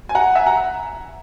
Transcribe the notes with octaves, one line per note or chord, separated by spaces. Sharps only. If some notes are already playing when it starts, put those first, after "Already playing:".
G#5
F#5 A#5
E5 G#5
F#5 A#5